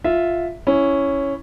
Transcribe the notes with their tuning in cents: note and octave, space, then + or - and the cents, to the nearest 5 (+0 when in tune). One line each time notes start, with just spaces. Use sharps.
F4 +0 E5 +0
C#4 +0 E4 +0